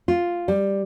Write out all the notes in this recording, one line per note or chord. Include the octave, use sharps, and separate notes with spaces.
F4
G3